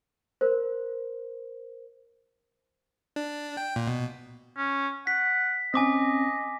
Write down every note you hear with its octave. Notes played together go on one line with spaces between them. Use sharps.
A#4 C5
D4
G5
A#2
B2
C#4
F#5 B6
C4 C#4 D#5 G#5 D6 A#6